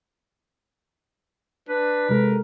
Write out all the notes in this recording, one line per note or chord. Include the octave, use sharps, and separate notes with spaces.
D4 B4
C3 G#3 A4 A#4